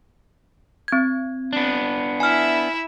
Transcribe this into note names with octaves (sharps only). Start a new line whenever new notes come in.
C4 G#6
B3 D4
E4 E5 G#5 F6